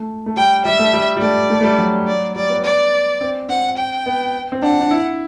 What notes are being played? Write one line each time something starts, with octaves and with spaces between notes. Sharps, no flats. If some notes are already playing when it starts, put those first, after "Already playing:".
Already playing: A3
A3
G3 G5
G3 E5
A3
G3
G3
A3 D5
A3
A3
G3
F#3
D5
G3 D5
B3
D5
C4
C4 F#5
G5
B3
C4
D4 F#5
D4
E4